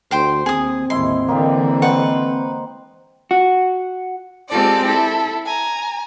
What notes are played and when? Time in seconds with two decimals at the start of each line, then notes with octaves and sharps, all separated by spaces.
0.11 D2 C5 G5 C6
0.46 D#2 C4 G#4 D#6
0.90 A1 D#2 G#3 E4 C6
1.28 D3 E3 A#3 D#4 G4
1.82 G#3 B4 C5 F#5 G5 C#6
3.31 F#4
4.50 G#3 C4 F4 G4 A4 D5
4.84 E4 A4
5.45 G#5 A#5